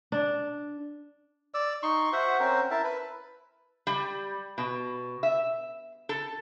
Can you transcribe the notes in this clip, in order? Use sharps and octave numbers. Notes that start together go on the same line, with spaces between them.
D4
D5 E6
D#4 C6 C#6
F#4 C5 E5 F#5
C4 C#4 A#4 C5
E4 A#4 E5 A5
B4
G3
B2
E5
A4